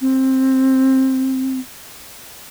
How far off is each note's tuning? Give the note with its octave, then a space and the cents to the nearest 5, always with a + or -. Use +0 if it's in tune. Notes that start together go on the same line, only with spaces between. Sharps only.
C4 +10